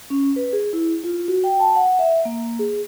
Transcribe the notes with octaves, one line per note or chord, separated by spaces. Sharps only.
C#4
B4
G#4
E4
F4
F#4
G5
A5
F#5
E5
A#3
G#4